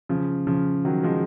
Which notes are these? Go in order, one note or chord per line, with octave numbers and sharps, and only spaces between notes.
C#3 F3
C#3 F3
D#3 F#3
F3 G#3